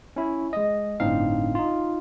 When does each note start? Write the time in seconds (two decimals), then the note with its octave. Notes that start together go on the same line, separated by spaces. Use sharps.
0.16 C#4 E4
0.53 G#3 D#5
1.00 G1 A2 C4 D4 D#4 F5
1.55 D#4 F4